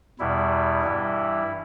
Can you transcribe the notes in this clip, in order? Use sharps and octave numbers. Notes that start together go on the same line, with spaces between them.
E2 B2 G3 E4
G2 E3 G3